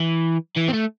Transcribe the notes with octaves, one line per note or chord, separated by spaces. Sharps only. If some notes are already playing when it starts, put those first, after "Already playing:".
Already playing: E3
E3
C4
A3